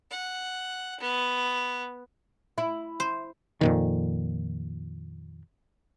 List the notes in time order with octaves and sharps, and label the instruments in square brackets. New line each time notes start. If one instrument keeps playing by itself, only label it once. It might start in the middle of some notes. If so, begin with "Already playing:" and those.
[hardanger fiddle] F#5
B3
[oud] E4
[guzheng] C5
[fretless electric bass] F2 A#2 D#3